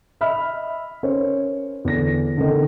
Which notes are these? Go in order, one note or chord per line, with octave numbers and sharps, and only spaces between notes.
D#5 E5 B5 F6
C#4 A#4 C5 C#5
E2 D3 A#6
D3 D#3